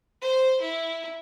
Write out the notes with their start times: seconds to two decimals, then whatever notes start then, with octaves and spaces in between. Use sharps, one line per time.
0.21 C5
0.61 E4